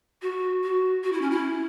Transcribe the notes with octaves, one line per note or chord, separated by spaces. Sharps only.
F#4
F#4
F#4
E4
C#4
E4